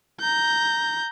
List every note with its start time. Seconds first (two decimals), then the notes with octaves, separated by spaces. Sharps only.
0.20 A#5 G6